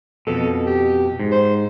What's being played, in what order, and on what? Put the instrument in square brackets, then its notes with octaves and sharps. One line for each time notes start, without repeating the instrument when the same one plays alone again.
[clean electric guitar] F2 B2 [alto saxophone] A4
[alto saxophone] G4
[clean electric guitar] G#2
[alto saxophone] C5